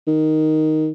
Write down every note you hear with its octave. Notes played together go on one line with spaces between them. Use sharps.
D#3